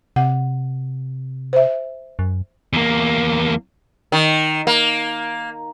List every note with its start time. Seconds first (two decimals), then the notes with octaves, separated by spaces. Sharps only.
0.16 C3 F#5
1.53 C5 E5
2.19 F#2
2.73 E2 A#3
4.12 D#3
4.67 A#3